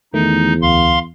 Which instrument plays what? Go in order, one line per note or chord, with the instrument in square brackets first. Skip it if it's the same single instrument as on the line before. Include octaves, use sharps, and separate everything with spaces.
[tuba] E2 [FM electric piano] D#3 A3 [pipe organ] D#4
[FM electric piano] D2 [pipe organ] F5 C6